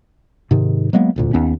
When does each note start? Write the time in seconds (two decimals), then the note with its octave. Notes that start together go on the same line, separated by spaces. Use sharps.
0.51 G#2 C3 D#3
0.93 F#3 G#3 A#3 B3
1.16 E1 D2 A#2
1.33 D#2 B3 C#4